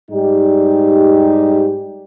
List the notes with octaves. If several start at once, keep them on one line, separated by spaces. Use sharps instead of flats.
G#2 G3 D#4 G4